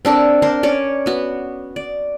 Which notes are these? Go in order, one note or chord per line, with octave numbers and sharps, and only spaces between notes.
C4 D4 A4 A#4
D4 A#4 C5
C#4 C#5 D5
B3 F#4
D5